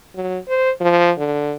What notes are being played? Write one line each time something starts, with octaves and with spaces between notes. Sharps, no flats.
F#3
C5
F3
D3